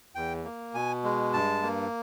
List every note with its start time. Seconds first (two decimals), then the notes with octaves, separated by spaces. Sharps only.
0.15 E2 G5
0.44 A#3
0.74 B2 G#5
1.04 G#3
1.33 G2 A5
1.62 A#3